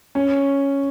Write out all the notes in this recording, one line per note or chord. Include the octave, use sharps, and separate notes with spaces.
C#4